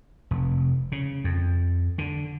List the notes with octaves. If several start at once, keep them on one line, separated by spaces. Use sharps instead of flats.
F1
C#3
F2
D3